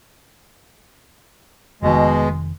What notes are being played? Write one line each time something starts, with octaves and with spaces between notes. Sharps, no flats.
F1 B2 D#3 G#3